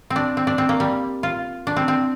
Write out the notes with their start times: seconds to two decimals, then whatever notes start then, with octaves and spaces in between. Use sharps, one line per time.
0.10 C4
0.16 D4
0.37 C4
0.47 D4
0.58 C4
0.69 A#3
0.80 G3
1.23 F4
1.67 D4
1.76 C4
1.88 C4